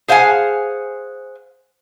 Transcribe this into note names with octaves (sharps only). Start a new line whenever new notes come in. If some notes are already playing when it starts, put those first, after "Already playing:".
G#4 C5 F5 F#5 G#5